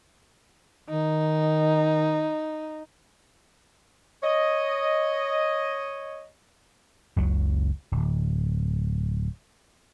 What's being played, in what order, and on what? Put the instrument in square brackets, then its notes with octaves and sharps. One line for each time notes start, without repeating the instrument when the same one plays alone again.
[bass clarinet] D#3 [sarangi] D#4
[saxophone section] C#5 D#5
[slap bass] F#1 C#2 F#3
D1